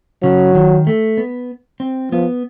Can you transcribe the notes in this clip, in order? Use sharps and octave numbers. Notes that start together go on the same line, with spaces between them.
C#3 F#3
D#3
A3
B3
C4
F3 B3